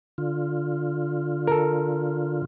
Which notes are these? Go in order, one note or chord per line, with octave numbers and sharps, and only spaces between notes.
D3 F4
A4 A#4